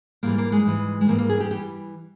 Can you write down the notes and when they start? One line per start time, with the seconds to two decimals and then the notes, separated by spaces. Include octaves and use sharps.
0.23 G#2 E3 G3 A#3
0.38 A#3
0.52 G#3
0.65 G#2 E3 G3
1.01 G#3
1.08 G#2 E3 G3 A#3
1.18 A#3
1.29 G#4
1.40 G4
1.51 E3 G3 G4